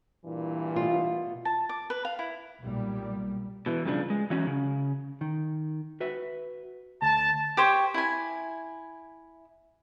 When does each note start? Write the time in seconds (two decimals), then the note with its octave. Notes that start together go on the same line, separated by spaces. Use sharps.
0.25 G2 A#2 E3
0.76 B2 A3 F4
1.45 A5
1.69 D6
1.90 B4
2.05 F5
2.19 E4
2.62 B1 A#2 G3
3.66 B2 E3
3.85 G2 C#3 F3 D4
4.10 G#3
4.30 E3 F#3 C#4
4.47 C#3
5.21 D#3
6.00 F#4 B4 E5
7.02 D2 A5
7.57 G4 C5 C#5
7.94 E4 G#5